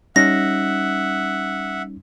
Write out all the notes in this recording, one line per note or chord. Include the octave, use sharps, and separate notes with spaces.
G3 C#4 D#4 E5 F#5 A#6